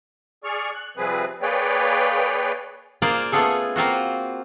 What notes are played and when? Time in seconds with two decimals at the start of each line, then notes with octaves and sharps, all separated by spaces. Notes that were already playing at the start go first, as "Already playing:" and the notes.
0.44 G#4 D5 C#6 F6
0.74 F#6
0.97 C3 F3 G3 C4 G#4 B4
1.42 A#3 G#4 B4 C#5 D5 G5
3.02 A#3 F4 G#4 C5 D5 F5
3.32 A3 B3 C#4 F4 G#4 A4
3.76 A#3 C4 F4 F#4